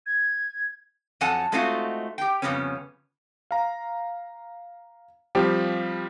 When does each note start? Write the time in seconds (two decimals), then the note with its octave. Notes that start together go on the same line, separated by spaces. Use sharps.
0.06 G#6
1.21 F2 F#3 A4 F#5 G#5 A5
1.52 G#3 A3 C4 D#4 F4 F#4
2.18 G4 G5
2.42 F2 G#2 C#3 G3 B3 C#4
3.51 F5 A#5
5.35 F3 G3 C4 G4